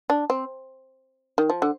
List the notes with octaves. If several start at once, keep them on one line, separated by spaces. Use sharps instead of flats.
D4
C4
D#3
F3
D3